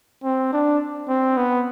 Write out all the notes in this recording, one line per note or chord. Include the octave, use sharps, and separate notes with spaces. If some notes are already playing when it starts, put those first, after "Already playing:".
C4
D4
C4
B3